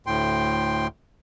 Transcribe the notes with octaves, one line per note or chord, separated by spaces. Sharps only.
D2 A2 G5 C6